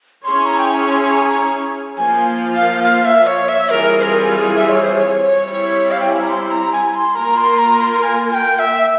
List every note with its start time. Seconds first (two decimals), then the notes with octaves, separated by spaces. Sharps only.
0.24 C#4 E4 G#4 C#5 C6
0.46 A#5
0.58 G5
0.68 G#5
0.89 C6
1.12 A#5
1.19 G#5
1.27 A#5
1.97 F3 A#3 F4 G#5
2.55 F5
2.83 F5
3.05 E5
3.27 C#5
3.49 E5
3.70 E3 G3 C4 F4 G#4 A#4
3.99 C5
4.03 A#4
4.57 E5
4.69 C#5
4.82 C5
4.95 C#5
5.43 G3 C4 E4
5.91 F5
6.00 G5
6.10 G#5
6.20 A#5
6.30 C6
6.51 A#5
6.72 G#5
6.94 C6
7.16 A#3 F4 A#4 A#5
7.37 C6
7.59 A#5
7.80 C6
8.02 G#5
8.31 G#5
8.34 G5
8.59 E5